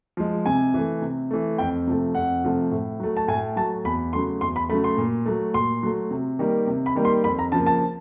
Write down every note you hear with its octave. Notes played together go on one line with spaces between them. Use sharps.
F3 G#3
C3 G#5
E3 A3
C3
E3 A3
F2 G5
C3 F3 A3
F2 F#5
C3 F3 A3
A2
F#3 A3
A5
A2 G#5
F#3 A3 A5
E2 B5
C#3 F#3 A3 C6
E2 C6
B5
C#3 F#3 A3 B5
C6
A#2
F#3 A3
A#2 C6
F#3 A3
C3
D#3 G3 A#3
C3
B5
D#3 G3 A#3
C6
F2 B5
A#5
C#3 F3 A#3 A5
A5